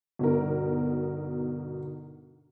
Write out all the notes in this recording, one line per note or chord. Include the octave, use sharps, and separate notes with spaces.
G1 B2 D#4 A#4